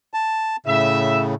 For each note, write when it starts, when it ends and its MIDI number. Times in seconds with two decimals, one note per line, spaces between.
0.14 0.56 81
0.66 1.35 45
0.66 1.35 49
0.66 1.22 76